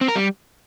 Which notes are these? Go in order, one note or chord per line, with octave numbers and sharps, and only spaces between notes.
C4
A#4
G3